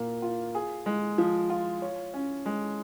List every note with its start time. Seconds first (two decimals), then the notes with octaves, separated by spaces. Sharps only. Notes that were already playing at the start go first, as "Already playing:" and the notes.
Already playing: A#2 A#3
0.22 F4
0.55 G#4
0.86 G#3
1.18 F3
1.50 F4
1.82 C#5
2.14 C#4
2.46 G#3